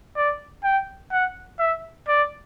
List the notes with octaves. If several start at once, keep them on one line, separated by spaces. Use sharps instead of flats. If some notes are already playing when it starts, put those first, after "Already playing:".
D5
G5
F#5
E5
D5